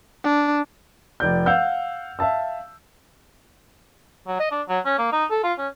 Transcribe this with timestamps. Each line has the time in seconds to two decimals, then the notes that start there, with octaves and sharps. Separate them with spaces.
0.24 D4
1.20 F1 D5 G6
1.46 F5 F#5 E6 G6
2.19 E5 F5 A5 E6
4.27 F#3
4.40 D#5
4.51 D4
4.68 F#3
4.85 C#4
4.98 A#3
5.12 D#4
5.31 A4
5.44 F4
5.58 C#4